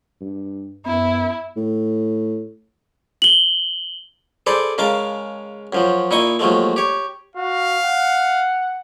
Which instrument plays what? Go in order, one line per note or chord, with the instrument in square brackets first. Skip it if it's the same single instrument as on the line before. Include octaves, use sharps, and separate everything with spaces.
[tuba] G2
[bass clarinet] F#2 [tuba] B3 [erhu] E4
[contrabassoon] A2
[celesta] F#7 G7
[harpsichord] G#4 A4 B4 C5 D5
C#3 G#3 A#4 F5 A5
F#2 F3 F#3
A#2 D#4 E4 D#5 C#6 D#6
D#2 F3 F#3 G#3 A3
G4 C#5
[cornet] F#4 [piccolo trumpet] F5
[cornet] F#5